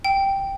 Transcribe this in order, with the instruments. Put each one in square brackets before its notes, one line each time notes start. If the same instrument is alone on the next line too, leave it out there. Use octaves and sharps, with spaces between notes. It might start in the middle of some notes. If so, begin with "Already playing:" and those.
[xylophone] G5